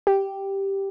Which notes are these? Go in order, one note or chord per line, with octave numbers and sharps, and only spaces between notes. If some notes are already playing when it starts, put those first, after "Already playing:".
G4